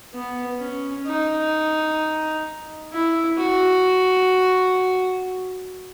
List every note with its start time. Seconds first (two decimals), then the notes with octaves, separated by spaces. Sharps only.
0.14 B3
0.60 C#4
1.07 D#4
2.92 E4
3.38 F#4